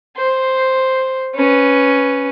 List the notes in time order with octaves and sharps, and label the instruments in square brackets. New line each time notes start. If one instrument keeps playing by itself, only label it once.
[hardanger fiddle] C5
C#4 B4